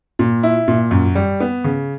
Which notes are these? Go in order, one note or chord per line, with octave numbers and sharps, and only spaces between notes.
A#2
E4
A#2
F#2
G3
B3
C#3